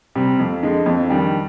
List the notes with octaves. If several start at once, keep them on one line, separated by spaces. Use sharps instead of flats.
C3 G3
F2
D3 G#3
F2
D#3 G3 D4